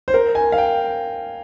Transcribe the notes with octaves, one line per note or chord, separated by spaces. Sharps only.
C5
A#4
G#5
F5
G5